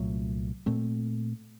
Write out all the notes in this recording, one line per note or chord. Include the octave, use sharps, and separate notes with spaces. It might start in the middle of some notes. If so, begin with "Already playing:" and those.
Already playing: C2 A#2 F#3 A3
A#2 A3 C4